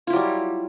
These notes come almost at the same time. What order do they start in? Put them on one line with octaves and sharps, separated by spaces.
F4 E4 F#3 G3